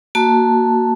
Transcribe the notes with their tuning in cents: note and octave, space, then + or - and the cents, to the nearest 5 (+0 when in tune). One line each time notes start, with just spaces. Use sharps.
A#3 +0 F#4 +0 A5 +0